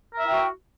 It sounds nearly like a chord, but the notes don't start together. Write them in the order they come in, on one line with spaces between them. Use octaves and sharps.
A#4 E5 E4 G5 F#4